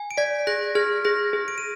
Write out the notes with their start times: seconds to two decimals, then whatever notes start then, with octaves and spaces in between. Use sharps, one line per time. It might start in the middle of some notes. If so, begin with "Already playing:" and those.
Already playing: G#5
0.11 D7
0.17 D5 G#6 B6
0.47 G#4 F#6 A#6
0.75 G#4 F6 G#6
1.05 G#4 F#6 A#6
1.33 G#4
1.48 D7
1.58 D#7